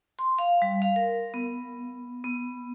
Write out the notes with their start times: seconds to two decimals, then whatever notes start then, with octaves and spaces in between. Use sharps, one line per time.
0.19 C6
0.39 F5
0.62 G3
0.82 F5
0.96 A#4
1.34 B3
2.24 B3